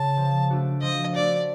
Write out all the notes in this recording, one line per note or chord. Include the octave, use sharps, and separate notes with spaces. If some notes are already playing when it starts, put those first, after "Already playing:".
Already playing: C#3 A5
F3
A3 D4 F#4
F3 D#5
A3 D4 F#4 D5